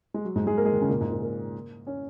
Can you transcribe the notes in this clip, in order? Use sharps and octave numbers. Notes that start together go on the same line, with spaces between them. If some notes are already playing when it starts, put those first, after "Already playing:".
G#3
F#3
G#2 G#3
G#3 G#4
A#3 A#4
G#3 G#4
D#3 D#4
C#3 C#4
A#2 A#3
G#2 G#3
A#2 A#3
A#3 A#4
C#4 C#5